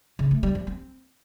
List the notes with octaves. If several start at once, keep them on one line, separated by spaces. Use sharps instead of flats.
C#3
A3
G3
F3
C4